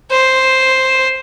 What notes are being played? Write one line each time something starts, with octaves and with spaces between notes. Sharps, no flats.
C5